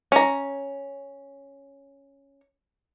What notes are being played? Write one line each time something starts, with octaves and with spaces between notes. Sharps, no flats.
C#4 A#5